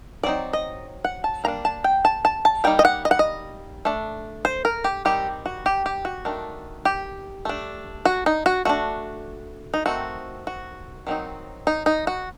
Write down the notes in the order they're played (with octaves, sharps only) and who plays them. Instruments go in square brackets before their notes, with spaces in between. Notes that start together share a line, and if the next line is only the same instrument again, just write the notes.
[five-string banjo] F#3 C4 D#4 D5
D#5
F#5
A5
G3 A#3 D4 A#5
A5
G5
A5
A5
A5
G3 A#3 D#4 G5
D#5
F#5
D#5
F#5
D#5
A3 D4
C5
A#4
G4
D#3 G3 C4 D#4 G4
F#4
G4
G4
F#4
D#3 A3 D4
G4
A3 D4
F#4
D#4
F#4
A3 D4 F#4
D#4
D#3 A3 C4 D#4 F#4
F#4
D#3 F#3 C4 D#4
D#4
D#4
F#4